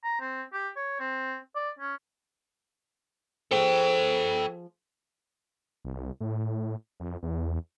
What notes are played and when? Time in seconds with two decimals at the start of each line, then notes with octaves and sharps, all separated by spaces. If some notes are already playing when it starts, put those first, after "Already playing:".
0.04 A#5
0.21 C4
0.54 G4
0.76 C#5
1.00 C4
1.56 D5
1.79 C#4
3.51 F3 G#4 A4 C5 G5
5.85 C2
6.20 A2
7.00 F2
7.23 E2